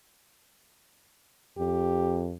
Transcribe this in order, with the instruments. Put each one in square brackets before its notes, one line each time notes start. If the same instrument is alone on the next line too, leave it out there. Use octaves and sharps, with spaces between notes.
[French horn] F2 [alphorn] G4